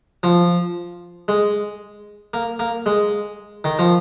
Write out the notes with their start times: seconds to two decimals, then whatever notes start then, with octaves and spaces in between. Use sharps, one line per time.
0.23 F3
1.28 G#3
2.34 A#3
2.59 A#3
2.86 G#3
3.64 D#3
3.79 F3